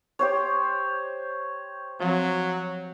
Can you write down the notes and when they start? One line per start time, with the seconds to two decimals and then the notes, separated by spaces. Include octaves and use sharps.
0.19 G4 C5 C#5
2.01 F3 F#3 C4